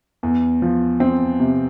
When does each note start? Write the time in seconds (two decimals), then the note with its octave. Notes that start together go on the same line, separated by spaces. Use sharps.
0.23 E2
0.62 F3
1.00 C4
1.40 C3